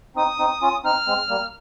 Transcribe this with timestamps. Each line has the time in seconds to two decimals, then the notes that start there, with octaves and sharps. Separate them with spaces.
0.16 C4 D#4 D#6
0.39 C4 D#4
0.62 C#4 F4
0.84 C4 D#4 F6
1.07 G#3 C4
1.30 G3 A#3